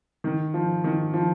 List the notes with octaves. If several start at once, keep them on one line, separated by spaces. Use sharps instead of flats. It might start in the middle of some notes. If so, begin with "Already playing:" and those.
D#3
F3
D#3
F3